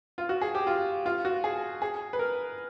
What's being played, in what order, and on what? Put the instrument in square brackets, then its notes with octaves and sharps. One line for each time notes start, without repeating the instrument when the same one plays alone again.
[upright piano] F4
F#4
G#4
G4
F4
F4
F#4
G#4
G#4
B4
A#4